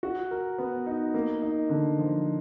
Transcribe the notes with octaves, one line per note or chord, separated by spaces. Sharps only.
F#4
A#4
B3
D#4
A#3
D#4
D3
F3